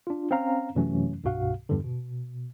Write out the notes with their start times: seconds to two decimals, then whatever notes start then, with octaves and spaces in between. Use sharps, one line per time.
0.07 D4 F4
0.31 C4 C#4 F5 A#5
0.75 F#2 C3 E3 F#3 A3 C#4
1.24 C2 G2 B2 F#4 F5 F#5
1.69 E2 G2 D3
1.84 B2